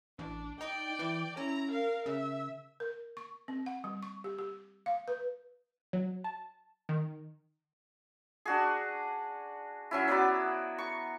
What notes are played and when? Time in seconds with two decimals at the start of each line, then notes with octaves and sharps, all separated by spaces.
0.19 A1 D4
0.61 D#4 D5 G5
0.99 E3
1.37 C#4 E4 A#5
1.71 A#4 F5
2.06 C#3 E5
2.80 A#4
3.17 C#6
3.48 C4
3.66 F#5
3.84 G3
4.03 C#6
4.24 G4
4.38 G4
4.86 F5
5.08 B4
5.93 F#3
6.24 A5
6.89 D#3
8.45 D4 F#4 G#4
9.91 F#3 C#4 E4
10.08 F#3 B3 D5 B5
10.78 C#6